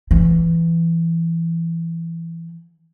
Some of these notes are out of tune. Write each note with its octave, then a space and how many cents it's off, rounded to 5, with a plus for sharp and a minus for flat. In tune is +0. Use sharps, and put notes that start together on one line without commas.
E3 +15